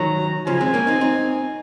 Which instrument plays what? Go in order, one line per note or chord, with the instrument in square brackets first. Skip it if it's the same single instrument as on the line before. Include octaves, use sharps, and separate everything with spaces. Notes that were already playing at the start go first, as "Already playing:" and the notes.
Already playing: [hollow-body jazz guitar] D#3 F#3 [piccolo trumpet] A#5
[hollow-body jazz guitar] C#3 F3 [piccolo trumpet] G#5
[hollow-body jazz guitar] G#3 C4
A#3 C#4
C4 D#4
C4 D#4